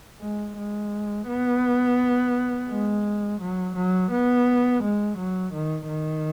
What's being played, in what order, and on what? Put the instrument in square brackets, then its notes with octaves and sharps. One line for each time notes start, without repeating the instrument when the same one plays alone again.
[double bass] G#3
G#3
B3
G#3
F#3
F#3
B3
G#3
F#3
D#3
D#3